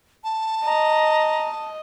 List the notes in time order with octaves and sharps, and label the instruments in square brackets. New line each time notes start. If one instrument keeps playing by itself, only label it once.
[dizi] A5
[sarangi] D#5 [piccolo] A#5